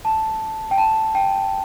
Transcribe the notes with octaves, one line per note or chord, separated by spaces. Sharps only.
A5
G5
A5
G5